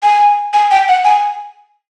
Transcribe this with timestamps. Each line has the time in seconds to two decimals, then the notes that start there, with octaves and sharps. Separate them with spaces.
0.03 G#5
0.53 G#5
0.71 G5
0.88 F#5
1.04 G#5